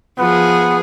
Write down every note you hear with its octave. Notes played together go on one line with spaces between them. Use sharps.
F3 B3 G#4